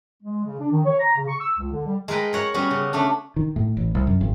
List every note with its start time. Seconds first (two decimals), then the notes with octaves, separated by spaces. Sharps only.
0.23 G#3
0.45 C#3
0.59 D4
0.71 D#3
0.85 C#5
0.99 A#5
1.16 C#3
1.28 C#6
1.40 E6
1.58 C#2
1.72 D3
1.86 G3
2.08 G#3 A#4 B4 G5
2.33 A#4 C#5 F#5
2.54 G3 B3 C#4 F#4
2.71 C#3
2.93 A3 C#4 D4
3.36 D#3
3.56 A2
3.77 A1
3.95 C2
4.07 F#2
4.21 G#1